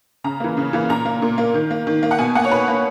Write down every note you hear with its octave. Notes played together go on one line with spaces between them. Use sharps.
C#3 A#5
E3 A#3
C#3
E3 A#3
A#2 A#5
A#3
A#2
A#3
D#3
A#3
D#3
A#3
F#5
B2 G#5
A#3 F#5
C#5
B2 B4
A#3